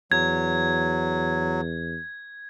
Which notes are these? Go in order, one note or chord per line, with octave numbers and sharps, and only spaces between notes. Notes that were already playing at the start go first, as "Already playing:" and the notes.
E2 F#3 G#6